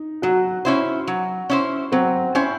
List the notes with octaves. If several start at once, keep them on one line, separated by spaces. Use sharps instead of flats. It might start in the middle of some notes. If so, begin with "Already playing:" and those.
Already playing: D#4
F#3 F#4
C#4 E4 C5
F#3
C#4 E4 C5
F#3 C4
C#4 E4 C5